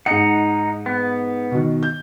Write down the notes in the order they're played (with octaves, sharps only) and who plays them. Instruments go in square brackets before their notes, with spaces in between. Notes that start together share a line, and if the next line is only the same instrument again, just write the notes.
[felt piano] G#2 C#7 [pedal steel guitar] D#4 F#5
[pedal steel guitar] B3
[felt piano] B2 D#3
G6